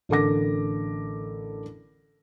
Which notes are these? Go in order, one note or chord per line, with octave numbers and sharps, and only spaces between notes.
A1 D3 A4 A#4 D6 A#6